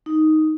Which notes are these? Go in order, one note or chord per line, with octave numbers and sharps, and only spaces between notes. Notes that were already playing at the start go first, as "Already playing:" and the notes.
D#4